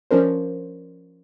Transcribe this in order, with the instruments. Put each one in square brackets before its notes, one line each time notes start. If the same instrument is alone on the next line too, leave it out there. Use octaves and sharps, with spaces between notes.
[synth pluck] F3 C#4 D4 A#4 C5